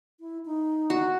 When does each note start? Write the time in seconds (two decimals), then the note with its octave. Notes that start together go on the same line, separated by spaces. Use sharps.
0.20 E4
0.45 D#4
0.90 F#4